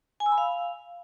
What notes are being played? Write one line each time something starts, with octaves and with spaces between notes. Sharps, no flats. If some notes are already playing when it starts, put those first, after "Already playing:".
G#5
E6
B5
F5